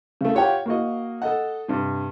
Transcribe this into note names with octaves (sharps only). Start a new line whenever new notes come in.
C#3 A3
F4 G4 C#5 F#5 G5
A#3 F#4 D#5
A4 D#5 F#5
G2 C3